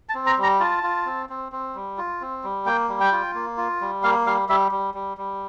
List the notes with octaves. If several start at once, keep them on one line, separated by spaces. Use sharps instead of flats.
A5
C4
A#5
G3
A#5
F4 A5
F4
C4
C4
C4
G3
F4
C4
G3
A#3 G5
G3
G5
F4
A#3
F4
G3
A#3 F5
G3 F5
G3 E5
G3
G3
G3